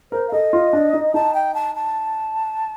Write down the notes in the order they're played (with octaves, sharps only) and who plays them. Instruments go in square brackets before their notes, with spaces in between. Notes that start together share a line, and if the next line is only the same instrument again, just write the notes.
[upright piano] A#4 [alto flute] C5
[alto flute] F5
[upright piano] A4 [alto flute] D#5
[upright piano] F4
D4
D#4
[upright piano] D#4 [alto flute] A5
[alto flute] G5
A5
A5